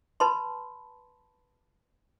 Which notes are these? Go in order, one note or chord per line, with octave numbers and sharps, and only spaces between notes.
B4 A5 B5 C6